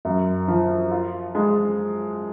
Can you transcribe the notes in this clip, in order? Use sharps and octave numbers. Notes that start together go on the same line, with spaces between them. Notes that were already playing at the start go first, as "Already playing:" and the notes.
F#2
F3
F4
G#3